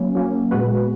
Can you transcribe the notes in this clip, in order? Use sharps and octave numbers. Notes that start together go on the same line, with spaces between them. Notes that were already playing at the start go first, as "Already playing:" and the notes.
Already playing: F#3 A#3 C#4
F#3 A#3 C#4
A#2 G#3 B3 F#4 B4